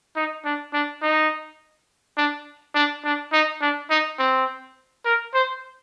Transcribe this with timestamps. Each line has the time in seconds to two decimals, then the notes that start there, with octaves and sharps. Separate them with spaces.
0.16 D#4
0.45 D4
0.73 D4
1.02 D#4
2.17 D4
2.74 D4
3.04 D4
3.32 D#4
3.61 D4
3.90 D#4
4.19 C4
5.05 A#4
5.34 C5